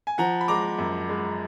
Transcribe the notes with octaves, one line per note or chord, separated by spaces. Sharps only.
G#5
F3 F#5 A#5
B5
G#3 A#5 D6
F#2
G#3